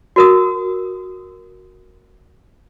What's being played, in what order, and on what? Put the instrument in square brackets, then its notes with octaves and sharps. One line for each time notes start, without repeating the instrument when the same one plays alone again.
[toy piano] F#4 A#4 D#6